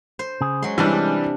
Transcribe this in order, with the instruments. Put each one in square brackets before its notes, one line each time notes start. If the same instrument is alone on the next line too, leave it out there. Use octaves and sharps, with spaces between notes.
[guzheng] C5
[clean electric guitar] C#3 G#4
[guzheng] F#3 C6 [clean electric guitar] G#3 C#4
[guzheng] C3 D4 [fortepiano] E3 G3